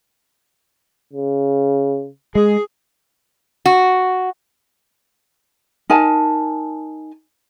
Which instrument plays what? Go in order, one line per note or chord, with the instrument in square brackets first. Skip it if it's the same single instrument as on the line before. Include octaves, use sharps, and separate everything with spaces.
[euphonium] C#3
[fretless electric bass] G#3 [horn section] G#4
[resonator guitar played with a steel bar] F#4
[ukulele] D#4 A#4 G#5 A5